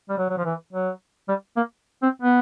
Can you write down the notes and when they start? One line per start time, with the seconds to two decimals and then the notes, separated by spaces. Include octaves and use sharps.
0.09 G3
0.18 F#3
0.29 F#3
0.38 F3
0.45 E3
0.73 F#3
1.29 G3
1.57 A#3
2.03 C4
2.22 B3